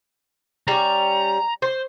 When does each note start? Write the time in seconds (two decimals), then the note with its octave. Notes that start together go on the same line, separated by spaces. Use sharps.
0.68 G3 C#4 A#5
1.62 C5